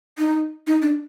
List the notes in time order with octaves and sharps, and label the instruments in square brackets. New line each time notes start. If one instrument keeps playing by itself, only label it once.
[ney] D#4
D#4
D4